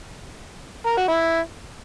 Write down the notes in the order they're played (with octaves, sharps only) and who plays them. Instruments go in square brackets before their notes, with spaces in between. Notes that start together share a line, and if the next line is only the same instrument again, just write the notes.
[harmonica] A#4
F#4
E4